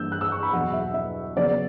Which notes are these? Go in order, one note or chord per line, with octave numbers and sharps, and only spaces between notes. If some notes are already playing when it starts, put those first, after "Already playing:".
Already playing: G2 E3 A#3 E6 G6
F#6
E6
C#6
B5
E2 B2 F#3 F#5
E5
E5
C#3 F#3 B3 D5